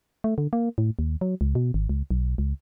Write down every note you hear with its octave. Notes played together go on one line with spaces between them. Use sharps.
A3
D3
A#3
A2
D#2
F#3
C#2
B2
G#1
C#2
B1
C#2